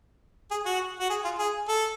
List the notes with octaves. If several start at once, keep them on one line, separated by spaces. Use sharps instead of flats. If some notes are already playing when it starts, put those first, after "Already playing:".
G#4
F#4
F#4
G#4
F4
G#4
A4